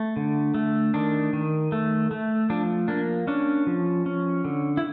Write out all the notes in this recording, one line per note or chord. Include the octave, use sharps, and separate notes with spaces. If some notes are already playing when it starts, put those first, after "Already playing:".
Already playing: A3
D3
A3
D#3 D4
D#3
A3
A3
F3 D4
A#3 D4
C#4 D4
F3
C#4
D3
E4